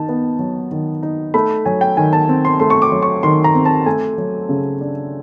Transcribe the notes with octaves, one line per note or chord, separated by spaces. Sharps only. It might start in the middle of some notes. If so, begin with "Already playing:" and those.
Already playing: D#3 D#4 A5
B3
F#3
D#3
D#4
A3 B5
F#3 G#5
G5
D#3 G#5
A5
C4
C6
A3 C6
C#6
D6
F#3
C#6
D#3 C6
A#5
C4
A5
A3 G#5
F#3
C#3
D4